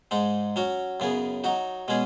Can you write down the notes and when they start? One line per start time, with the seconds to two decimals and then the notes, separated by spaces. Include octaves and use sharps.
0.11 G#2 G#3 D#4
0.56 F#3 C#4 F#4
1.00 F#2 C#3 B3 G#4
1.44 F#3 D#4 F#4
1.88 B2 G#3 C#4 G#4